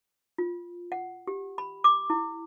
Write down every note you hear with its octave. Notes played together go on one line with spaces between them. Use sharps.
F4
F#5
G4
B5
D6
E4